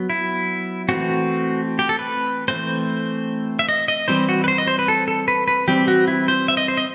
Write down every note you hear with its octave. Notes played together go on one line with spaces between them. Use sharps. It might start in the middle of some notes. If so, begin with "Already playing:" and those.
Already playing: F#3 B3
E4
E3 A3 C4 F#4
G4
A4
B4
E3 A3 C4 C5
E5
D#5
D#5
E3 G3 C4 C5
F#4
B4
C5
D#5
C5
B4
A4
A4
B4
B4
E3 G3 C4 G4
F#4
E4
C5
E5
D#5
C5
D#5